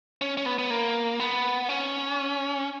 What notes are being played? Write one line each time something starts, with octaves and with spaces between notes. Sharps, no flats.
C#4
C#4
B3
B3
A#3
B3
C#4